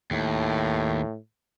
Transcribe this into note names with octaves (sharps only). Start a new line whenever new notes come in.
D#2 A2